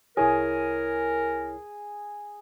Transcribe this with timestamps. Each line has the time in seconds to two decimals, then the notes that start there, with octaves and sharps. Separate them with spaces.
0.17 C2 E4 G#4 A#4 C#5